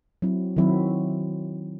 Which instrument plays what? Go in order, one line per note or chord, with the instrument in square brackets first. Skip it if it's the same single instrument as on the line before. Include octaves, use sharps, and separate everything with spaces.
[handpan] F#3 C4 E4
D#3 F#3 C4 E4